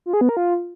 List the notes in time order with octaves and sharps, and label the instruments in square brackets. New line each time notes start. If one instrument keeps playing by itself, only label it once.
[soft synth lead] F4
G#4
B3
A#4
F4